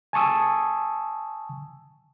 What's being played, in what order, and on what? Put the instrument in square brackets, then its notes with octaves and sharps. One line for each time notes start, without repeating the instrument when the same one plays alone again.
[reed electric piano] G#5 A5 C#6 D#6 E6